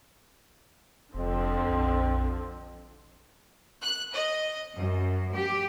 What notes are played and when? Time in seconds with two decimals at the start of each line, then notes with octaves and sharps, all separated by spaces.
1.14 F1 F2 D3 F3 C4
1.69 A#1
3.81 F#6
4.13 D#5
4.75 F#2
5.33 G4